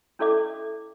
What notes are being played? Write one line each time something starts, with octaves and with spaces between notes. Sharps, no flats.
C#4 E4 A4 D5 E5 D6